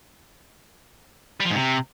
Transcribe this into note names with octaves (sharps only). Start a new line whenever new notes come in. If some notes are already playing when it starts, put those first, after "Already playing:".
G3
F3
G#2
C3